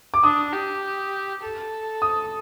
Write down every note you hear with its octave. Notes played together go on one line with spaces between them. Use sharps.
D6
D4 D#6
G4
A4
D#6